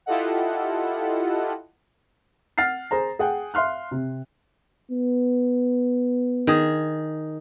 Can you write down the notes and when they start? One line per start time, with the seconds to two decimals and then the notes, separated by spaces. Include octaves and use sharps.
0.06 E4 F4 G4 A4 D#5 F#5
2.58 F#5 F6 A6 C7
2.91 G#4 C5 A#5
3.19 G#4 F#5 G5
3.54 E5 F5 C6 F6 F#6
3.91 C3
4.92 B3
6.47 D#3 G#4